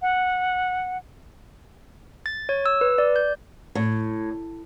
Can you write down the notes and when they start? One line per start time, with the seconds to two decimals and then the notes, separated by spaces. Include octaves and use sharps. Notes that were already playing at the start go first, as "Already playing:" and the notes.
0.02 F#5
2.26 A6
2.49 C#5
2.66 E6
2.81 B4
2.98 D5
3.16 G6
3.75 A2